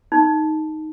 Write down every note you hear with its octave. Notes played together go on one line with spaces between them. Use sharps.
D#4